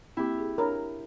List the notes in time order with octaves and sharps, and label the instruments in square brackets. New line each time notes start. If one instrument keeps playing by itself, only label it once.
[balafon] A#3 C4 [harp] E4 G4
[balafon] G#4
[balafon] D4 C#5 B5 [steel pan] A#4